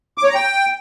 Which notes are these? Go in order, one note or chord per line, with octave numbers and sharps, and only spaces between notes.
D6
C#5
A#5
G5